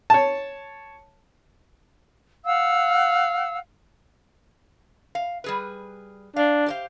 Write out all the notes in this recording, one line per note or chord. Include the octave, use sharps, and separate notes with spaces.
C#5 A5
F5 F#5 E6
F5
G3 G#4 B4
D4 F5
G4 C5 F5